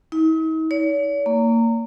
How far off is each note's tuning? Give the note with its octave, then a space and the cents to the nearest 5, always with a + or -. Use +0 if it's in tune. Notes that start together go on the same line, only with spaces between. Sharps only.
D#4 +45
C#5 +45
A#3 -25